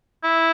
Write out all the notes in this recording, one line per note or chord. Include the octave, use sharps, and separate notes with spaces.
E4